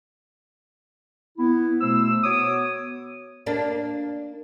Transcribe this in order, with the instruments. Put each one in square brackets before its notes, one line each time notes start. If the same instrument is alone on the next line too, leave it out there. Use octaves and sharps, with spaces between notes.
[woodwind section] B3 E4
B2 A3 C5 E6
B3 F#4 C#5 D6 D#6
[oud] A#3 D4